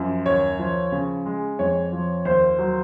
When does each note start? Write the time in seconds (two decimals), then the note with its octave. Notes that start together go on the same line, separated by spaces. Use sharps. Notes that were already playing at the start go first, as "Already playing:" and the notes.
Already playing: F#2 F3
0.26 D#2 C#5
0.59 F3
0.92 C#3
1.26 G#3
1.59 F2 C#5
1.92 F3
2.25 D#2 C5
2.58 F#3